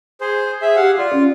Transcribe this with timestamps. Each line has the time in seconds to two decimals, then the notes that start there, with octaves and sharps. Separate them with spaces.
0.21 G#4 C5
0.62 G#4 E5
0.76 G4 F5 F#5
0.98 F4 D5
1.13 C#4